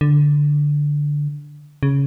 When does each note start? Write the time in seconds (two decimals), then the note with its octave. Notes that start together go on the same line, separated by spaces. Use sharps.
0.01 D3
1.83 C#3